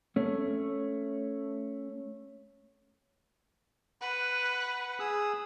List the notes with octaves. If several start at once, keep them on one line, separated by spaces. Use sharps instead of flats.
A3 C#4
B4 F#5
G#4 D#6 E6